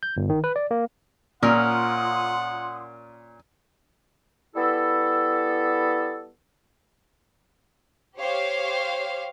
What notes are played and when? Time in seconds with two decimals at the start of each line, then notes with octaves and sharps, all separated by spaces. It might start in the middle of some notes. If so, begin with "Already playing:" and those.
0.03 G6
0.17 G1
0.29 D#3
0.44 B4
0.56 D5
0.71 A#3
1.43 A#2 C#4 F4 A#4 F#5 C6 D#6
4.55 G3 B3 E4 A4
8.18 G4 C5 C#5 F5